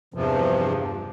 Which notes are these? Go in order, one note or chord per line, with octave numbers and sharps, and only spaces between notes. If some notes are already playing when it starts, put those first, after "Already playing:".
E2 G2 C3 F3